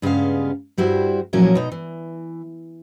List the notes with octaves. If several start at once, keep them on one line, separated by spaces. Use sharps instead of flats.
G2 C#3 G#3 B3 F5
G2 G3 E4 F#4 C5
A#2 F3 F#3 C#4 E4 A#4
B2 D#4
E3